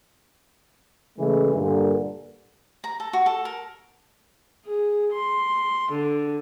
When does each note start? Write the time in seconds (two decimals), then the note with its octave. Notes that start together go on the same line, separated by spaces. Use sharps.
1.19 C#3 E3 G#3 A3
1.54 G2 A#2 D3
2.84 A#5
3.00 A4
3.13 F#4
3.26 A4
3.45 A#4
4.66 G#4
5.13 C6
5.91 D3